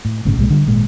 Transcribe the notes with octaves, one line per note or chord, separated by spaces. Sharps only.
A2
G1 A2 C#3
C2 A#2 G#3
D3 G3
G#1 A#2 G#3